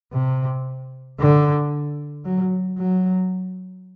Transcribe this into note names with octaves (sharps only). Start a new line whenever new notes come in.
C3
D3
F#3
F#3